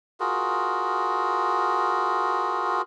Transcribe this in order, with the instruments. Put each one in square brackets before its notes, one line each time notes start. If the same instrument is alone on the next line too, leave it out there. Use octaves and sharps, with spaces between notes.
[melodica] F4 F#4 G#4 A#4